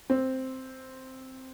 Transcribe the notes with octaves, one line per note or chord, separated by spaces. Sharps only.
C4